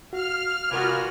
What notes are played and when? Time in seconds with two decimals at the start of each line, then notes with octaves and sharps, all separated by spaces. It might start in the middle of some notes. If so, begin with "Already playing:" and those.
0.13 F#4 F5 F6
0.71 C3 F4 F#4 A#4 B4 D5 G#5 D#6